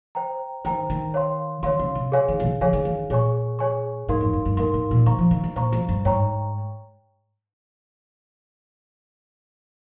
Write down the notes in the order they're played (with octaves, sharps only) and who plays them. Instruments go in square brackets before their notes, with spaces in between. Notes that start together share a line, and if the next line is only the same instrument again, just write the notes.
[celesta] C5 G5 A#5
[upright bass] D#3 [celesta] C5 G5 A#5
[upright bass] D#3
[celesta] C#5 F5 C6
[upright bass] D#3 [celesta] C#5 F5 C6
[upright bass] C#3
C3
[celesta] G#4 C#5 F5 G#5
[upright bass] D#3
C3
C#3
[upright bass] F3 [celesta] G#4 C#5 F5 G#5
[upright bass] D#3
D#3
[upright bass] A#2 [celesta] G#4 C#5 G#5 C#6
[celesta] G#4 C#5 G#5 C#6
[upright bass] G#2 [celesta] D#4 A#4 F5 C6
[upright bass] F2
G2
G2
[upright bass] G#2 [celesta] D#4 A#4 F5 C6
[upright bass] G#2
A#2
[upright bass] D#3 [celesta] C5 F5 A#5 C#6
[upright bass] F3
D#3
D#3
[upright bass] A#2 [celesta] C5 F5 A#5 C#6
[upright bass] F2
G2
[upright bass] G#2 [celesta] C#5 G5 A#5 C#6